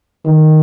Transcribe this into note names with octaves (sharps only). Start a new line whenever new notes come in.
D#3